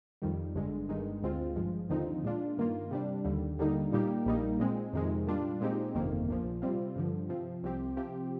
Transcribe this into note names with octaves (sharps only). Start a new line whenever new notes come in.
F2 D#3 G3
G1 G2 D3 G#3
G1 G2 D#3 G#3 D#4
D2 D3 G#3 C4 F4
G#1 G2 F3 G#3
D#2 D3 F3 C4 D#4
A#2 G#3 D4 F4
G2 D#3 A#3 F4
C3 G3 D4
D#2 D3 G3
D#2 D3 G3 A#3 D#4
A#2 G3 A#3 D#4 G4
A#1 A#2 G3 A#3 D#4
A#2 G#3 C4
F2 C3 D#3 G#3
A#2 G3 D4 F4
A#2 G#3 C4 D#4 G4
G1 F2 C3 D#3 A#3
A#1 A#2 F3
C3 G3 C4 F4
G2 D3 F3
C3 F3 C4
C2 C3 F3 C4 G4
C3 F3 C4 G4